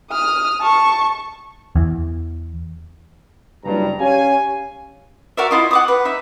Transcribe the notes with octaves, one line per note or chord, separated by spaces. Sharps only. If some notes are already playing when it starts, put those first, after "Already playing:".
D#6 F6
A5 C#6
E2
F#1 G2 A#5
C#4 G4 C#5 F5 G#5
F#4 A#4 D5 E5
E4 F4 D#5
F#5 D6 D#6
B4
D#4 E5